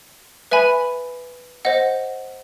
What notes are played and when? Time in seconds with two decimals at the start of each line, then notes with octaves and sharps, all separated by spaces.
0.51 B4 E5 G#5 B5
1.65 C5 D#5 F#5